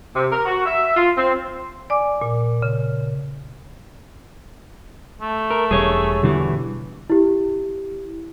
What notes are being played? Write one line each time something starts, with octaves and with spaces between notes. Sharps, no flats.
C3
A#4
F#4
E5
F4
C4
D5 G#5 D6
A#2
C#3
A3
A#4
E1 G3 G#4 C#5
E2 B2 D3 E3 G3
E4 G4